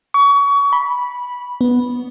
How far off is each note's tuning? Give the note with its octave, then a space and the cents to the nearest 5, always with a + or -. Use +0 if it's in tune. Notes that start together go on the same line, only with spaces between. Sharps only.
C#6 +30
B5 -10
B3 +0